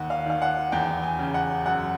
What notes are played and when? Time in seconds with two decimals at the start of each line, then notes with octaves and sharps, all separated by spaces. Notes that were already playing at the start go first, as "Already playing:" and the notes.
Already playing: D#2 F#5
0.10 F5
0.26 D#3 F5
0.42 F#5
0.72 E2 G5
1.03 G#5
1.19 C#3
1.34 F#5
1.66 F#2 F#5